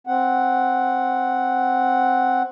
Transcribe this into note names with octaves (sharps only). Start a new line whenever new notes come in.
C4 F#5